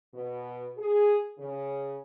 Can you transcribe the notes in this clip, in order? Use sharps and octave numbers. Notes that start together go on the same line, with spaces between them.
B2
G#4
C#3